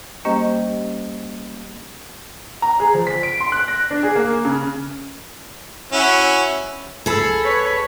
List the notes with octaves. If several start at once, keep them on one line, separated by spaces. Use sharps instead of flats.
G3 A#3 C#4 G4 C5 D#5
A#5
G#4
F3
B6
D7
C6
F#6
A#6
D4
G#4
A#3
C#3
C#4 E4 F#4
C#2 G#4 A4 B5 E6
B4 C#5